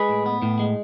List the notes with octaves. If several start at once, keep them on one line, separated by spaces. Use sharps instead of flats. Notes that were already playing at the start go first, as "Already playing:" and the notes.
Already playing: G#3 G#4 B4
A2
B3
A2
G#3